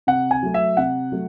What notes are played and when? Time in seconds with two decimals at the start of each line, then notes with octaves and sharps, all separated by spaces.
0.07 C3 F#5
0.31 G#5
0.43 F#3 A3
0.54 E5
0.77 C3 F#5
1.12 F#3 A3